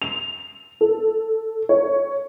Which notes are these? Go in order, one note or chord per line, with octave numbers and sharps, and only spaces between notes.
F7
A4
C#5